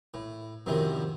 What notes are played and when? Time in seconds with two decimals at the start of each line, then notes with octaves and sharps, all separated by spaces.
0.14 A2
0.66 F#2 A2 C3 D#3 F3